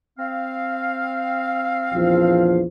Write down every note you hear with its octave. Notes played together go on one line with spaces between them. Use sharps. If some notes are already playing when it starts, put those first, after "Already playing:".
C4 F5
A#1 E2 F3